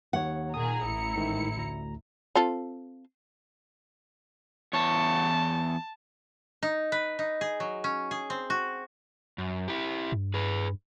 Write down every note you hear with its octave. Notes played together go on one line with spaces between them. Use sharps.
D#2 C#5 F#5
A#2 D#3 G#4 A#5 D#6
A1 E4 C#7
G#2 D#3
D2 A#5
C4 F4 A4
E2 C#5 A5
D#4
B4
D#4
G#4
F#3
C#4
G#4
C4
F#4
F#2
E4 G4
G2
G#4 B4